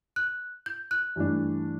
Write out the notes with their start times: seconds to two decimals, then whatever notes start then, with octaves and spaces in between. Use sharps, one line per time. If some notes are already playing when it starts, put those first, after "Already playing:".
0.16 F#6
0.66 G6
0.91 F#6
1.16 G2 E3 A3 D4